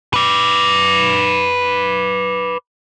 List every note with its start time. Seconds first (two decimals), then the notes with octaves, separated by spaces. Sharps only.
0.14 B4 D5